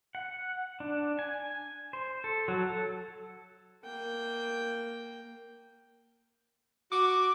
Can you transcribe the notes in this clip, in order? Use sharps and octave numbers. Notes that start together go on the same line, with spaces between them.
F#5
D4
G#5
C5
A4
F#3
A4
A#3 G5
F#4 D6